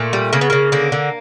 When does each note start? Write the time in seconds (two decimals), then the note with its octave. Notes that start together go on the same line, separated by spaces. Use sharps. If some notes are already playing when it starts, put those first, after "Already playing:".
Already playing: A#2 A3
0.13 G3
0.33 C#3 A#3
0.41 B3
0.50 C#3 A#3
0.72 D3 A#3
0.92 D3